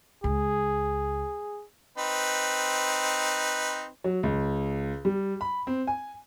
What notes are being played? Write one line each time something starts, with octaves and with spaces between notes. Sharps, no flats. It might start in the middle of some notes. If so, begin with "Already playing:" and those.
C#2 G#4
C4 D#4 B4
F#3
C#2
G3
B5
C4
G#5